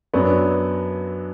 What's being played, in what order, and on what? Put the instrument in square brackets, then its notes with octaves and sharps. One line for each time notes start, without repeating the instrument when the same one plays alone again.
[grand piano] F#2 F#3 B3 D4 F#4